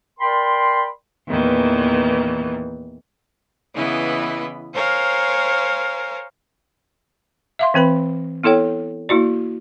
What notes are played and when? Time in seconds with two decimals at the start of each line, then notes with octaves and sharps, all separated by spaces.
0.20 A#4 D5 G5 B5 C6
1.27 E2 A#2 D#3 E3
3.75 C#3 E3 B3 E4 D#5 B5
4.74 A#4 C5 C#5 F5 G#5 A#5
7.59 E5 F5 C6
7.74 E3 C4 B4 B5
8.43 B3 E4 A4 C#5 G5
9.09 A#3 E4 F#4 D5